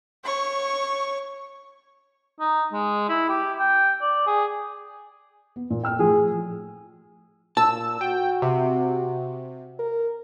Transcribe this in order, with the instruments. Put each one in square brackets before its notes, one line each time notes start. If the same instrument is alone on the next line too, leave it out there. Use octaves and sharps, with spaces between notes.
[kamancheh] C#5 C#6
[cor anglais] D#4
G#3
E4
G4
G5
D5
G#4
[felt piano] B3
A#2
G5 E6 F6
[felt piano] A2 F3 [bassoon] G#4
[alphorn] A#2 [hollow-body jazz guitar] A5 [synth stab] E6
[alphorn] F#4 [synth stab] G5
[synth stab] C3
[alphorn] A#4